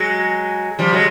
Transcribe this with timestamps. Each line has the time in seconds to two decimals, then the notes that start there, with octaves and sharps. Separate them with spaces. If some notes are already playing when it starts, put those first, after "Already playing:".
Already playing: F#3 G#3
0.79 F3 G3
0.93 F#3 G#3